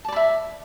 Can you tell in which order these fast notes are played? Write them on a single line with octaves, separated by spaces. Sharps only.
A5 D5 B5 E5